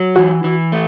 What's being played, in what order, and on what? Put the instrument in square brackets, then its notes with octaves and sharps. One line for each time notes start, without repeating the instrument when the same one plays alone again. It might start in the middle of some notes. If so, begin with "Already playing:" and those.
Already playing: [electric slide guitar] F#3
[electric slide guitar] E3 [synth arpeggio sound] F#4
[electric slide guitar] E3
A3